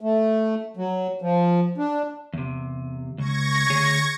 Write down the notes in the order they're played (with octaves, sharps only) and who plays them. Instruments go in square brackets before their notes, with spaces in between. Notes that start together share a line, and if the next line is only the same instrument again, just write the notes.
[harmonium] A3
F#3
F3
D4
[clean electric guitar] E2 C3
[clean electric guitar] C#2 [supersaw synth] C#6 G#6 A#6
[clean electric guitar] D2 G#4 C#5